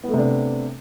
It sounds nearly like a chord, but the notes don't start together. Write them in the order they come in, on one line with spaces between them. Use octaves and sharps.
B3 A3 C3 D4